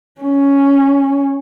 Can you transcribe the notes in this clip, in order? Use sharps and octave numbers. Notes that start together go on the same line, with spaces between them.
C#4